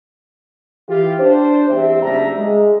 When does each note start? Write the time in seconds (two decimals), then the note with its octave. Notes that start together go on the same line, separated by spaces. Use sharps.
0.88 E3 E4 F4 G4
1.18 D4 C5
1.69 E2 G2 C4 G4 C5 E5
2.02 F#1 G3 D4 E5 A#5
2.37 G#3